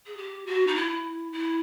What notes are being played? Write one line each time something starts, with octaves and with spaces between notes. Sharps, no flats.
G#4
G4
F#4
D#4
E4
E4